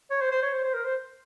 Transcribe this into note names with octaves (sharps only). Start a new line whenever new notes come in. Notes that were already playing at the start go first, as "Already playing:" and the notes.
C#5
C5
C5
C#5
C5
C5
A#4
C5